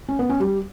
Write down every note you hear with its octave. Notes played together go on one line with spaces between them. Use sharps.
C#4
B3
C#4
G3